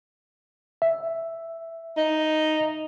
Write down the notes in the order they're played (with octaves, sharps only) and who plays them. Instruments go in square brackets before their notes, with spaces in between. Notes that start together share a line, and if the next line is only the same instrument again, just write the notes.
[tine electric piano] E5
[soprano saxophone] D#4